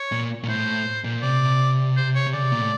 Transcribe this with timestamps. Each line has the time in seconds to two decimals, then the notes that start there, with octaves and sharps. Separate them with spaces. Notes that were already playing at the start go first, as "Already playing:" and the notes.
Already playing: C#5
0.12 A#2
0.43 A#2
0.48 A2 C5
1.04 A#2
1.22 C3 D5
1.97 C5
2.15 C#5
2.27 C3
2.33 C#3 D5
2.43 C3
2.52 A#2
2.61 A2